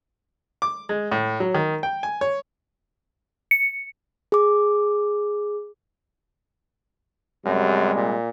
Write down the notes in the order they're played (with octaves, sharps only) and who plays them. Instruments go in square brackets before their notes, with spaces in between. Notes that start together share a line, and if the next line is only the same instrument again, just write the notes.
[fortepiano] D6
G#3
A2
F#3
D#3
G5
G#5
C#5
[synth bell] C#7
[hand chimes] G#4 D6
[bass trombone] F#2 [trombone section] C3 G3 G#3
[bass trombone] A#2